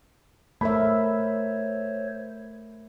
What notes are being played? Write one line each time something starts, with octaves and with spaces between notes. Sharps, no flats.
A3 A#4 C5 C#5 E5 B5